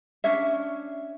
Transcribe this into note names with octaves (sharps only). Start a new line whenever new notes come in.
C#4 D4 C#5 E5